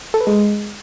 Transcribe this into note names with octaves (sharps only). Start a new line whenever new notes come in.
A4
B4
G#3